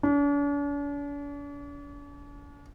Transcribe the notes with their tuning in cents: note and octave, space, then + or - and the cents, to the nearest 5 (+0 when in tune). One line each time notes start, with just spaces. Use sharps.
D4 -45